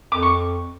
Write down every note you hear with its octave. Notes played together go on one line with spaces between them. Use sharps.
F2 D6
C#6